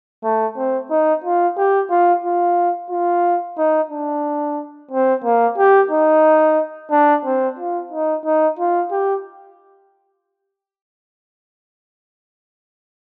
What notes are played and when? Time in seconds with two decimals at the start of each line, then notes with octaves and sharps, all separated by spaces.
0.24 A3
0.57 C4
0.90 D#4
1.24 F4
1.57 G4
1.90 F4
2.24 F4
2.90 F4
3.58 D#4
3.90 D4
4.91 C4
5.24 A#3
5.58 G4
5.91 D#4
6.91 D4
7.25 C4
7.59 F4
7.92 D#4
8.25 D#4
8.59 F4
8.91 G4